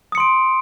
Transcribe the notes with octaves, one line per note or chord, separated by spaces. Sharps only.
C6 D#6 C#7 D7